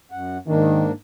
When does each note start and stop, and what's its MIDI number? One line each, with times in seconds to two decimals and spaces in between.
0.11 0.38 42
0.11 0.38 78
0.47 0.92 44
0.47 0.85 51
0.47 0.92 58
0.47 0.92 62